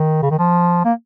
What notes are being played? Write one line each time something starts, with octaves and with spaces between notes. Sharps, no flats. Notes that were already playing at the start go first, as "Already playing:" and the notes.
Already playing: D#3
C#3
D#3
F3
A#3